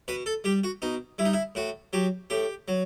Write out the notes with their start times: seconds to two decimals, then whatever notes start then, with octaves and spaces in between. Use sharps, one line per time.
0.08 B2 B4
0.26 A4
0.44 G3 G4
0.64 F#4
0.82 B2 D#4
1.18 G3 E4
1.25 D#4
1.33 E4
1.55 A2 F#4
1.93 F#3 G4
2.30 A2 G4
2.68 F#3